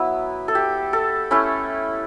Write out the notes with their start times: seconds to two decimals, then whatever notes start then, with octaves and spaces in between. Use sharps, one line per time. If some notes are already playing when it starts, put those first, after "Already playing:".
Already playing: F#3 B3 E4
0.48 A4
0.55 G4
0.93 A4
1.31 A3 C#4 E4